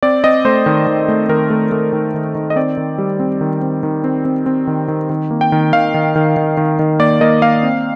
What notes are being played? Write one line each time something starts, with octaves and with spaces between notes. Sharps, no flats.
C4 D5
C4 D#5
A3 C5
D#3
D#3
A3
D#3 A#4
A3
A3
D#3
D#3
D#3
D#5
C4 D5
D#3
G3
C4
D#3
C4
D#3
C4
C4
C4
D#3
D#3
D#3
A#3
G5
D#3
D#3 F5
D#3
D#3
D#3
D#3
D#3
A#3 D5
A#3 D#5
A#3 F5
C4